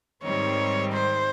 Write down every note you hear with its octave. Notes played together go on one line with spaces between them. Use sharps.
G#2 D#3 G3 C4 C#5
C5